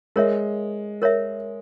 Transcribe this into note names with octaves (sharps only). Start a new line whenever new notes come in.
G#3 A#4 C#5 E5
A#4 C#5 E5